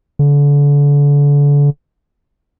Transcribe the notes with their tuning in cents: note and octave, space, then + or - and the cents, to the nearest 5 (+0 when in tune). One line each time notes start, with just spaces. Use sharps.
D3 -35